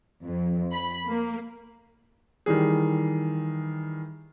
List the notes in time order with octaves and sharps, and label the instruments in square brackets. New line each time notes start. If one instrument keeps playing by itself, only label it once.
[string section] F2
B5
A#3
[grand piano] D#3 E3 G3 G#4